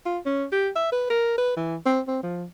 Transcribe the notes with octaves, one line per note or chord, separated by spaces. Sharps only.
F4
C#4
G4
E5
B4
A#4
B4
E3
C4
C4
F3